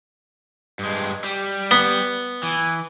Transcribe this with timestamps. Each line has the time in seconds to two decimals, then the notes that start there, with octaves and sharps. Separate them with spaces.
0.79 G2 G#3
1.24 G3
1.71 B3
2.43 E3